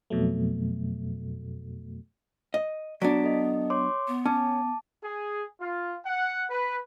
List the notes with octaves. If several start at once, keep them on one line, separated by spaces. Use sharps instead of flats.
F2 B2 F#3 A3
D#5
F#3 B3 D4 D5 B6 D7
A4 D#5
C#5 C6 D6
B3
C#4 A5 D6
G#4
F4
F#5
B4